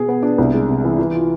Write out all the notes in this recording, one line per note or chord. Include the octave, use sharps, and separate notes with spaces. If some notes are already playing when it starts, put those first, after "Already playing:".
Already playing: B2 G#4
B3
D4
C2
G#3
C3
E3
E3
F4